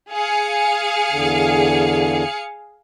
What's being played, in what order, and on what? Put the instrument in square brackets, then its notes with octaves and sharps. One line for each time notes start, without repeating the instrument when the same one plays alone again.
[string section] G#4 F5 C#7
[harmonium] E2 D3